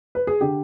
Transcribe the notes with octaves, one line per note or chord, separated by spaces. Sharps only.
B4
G#4
D3 G4